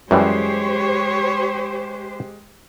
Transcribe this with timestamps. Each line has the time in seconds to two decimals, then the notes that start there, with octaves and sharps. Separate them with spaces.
0.11 F#2 E3 G3 G#3 G4 C5 C#5